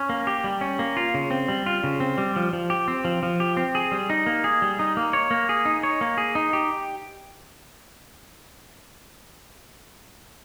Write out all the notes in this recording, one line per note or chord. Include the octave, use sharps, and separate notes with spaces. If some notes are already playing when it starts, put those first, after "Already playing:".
Already playing: C#4
A#3
G4
G3
C#4
A#3
F4
C#3
C4
G3
F4
C#3
C4
G3
F3
F3
G4
C4
F3
F3
G4
C4
G#4
G3
D#4
A#3
G#4
G3
D#4
A#3
C#5
A#3
G#4
D#4
C#5
A#3
G#4
D#4
G4